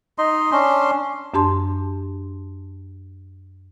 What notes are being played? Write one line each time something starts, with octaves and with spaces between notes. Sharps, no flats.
D#4 D#5 C6
C#4 D4 C6
F#2 D4 G4 A5 C6